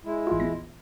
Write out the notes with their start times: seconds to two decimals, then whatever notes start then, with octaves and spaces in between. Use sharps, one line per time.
0.05 G#3 E4
0.27 A1 F4
0.40 A#1 E2 A#6